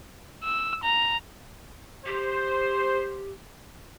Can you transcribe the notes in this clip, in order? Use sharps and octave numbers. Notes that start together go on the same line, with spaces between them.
E6
A#5
G4 C5